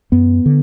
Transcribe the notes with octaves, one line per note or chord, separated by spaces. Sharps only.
F#2 B3
D3